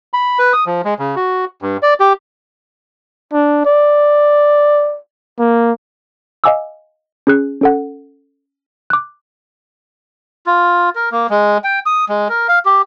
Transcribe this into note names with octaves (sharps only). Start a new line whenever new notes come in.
B5
B4
D#6
F3
G#3
C#3
F#4
G2
D5
G4
D4
D5
A#3
D#5 F5 G#5 D6 E6
C#4 G#4 F#6
C#4 A4 F#5
D6 F#6
F4
A#4
A#3
G#3
G5
D#6
G#3
A#4
F5
G4